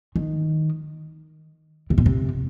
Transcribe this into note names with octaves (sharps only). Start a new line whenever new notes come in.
D#3
C3
B2
C3